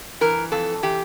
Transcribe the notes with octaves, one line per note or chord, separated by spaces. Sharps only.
E3 A#4
F2 A4
E3 G4